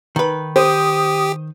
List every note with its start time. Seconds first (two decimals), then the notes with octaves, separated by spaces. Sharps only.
0.16 D#3 B4
0.56 G4 C5 D#6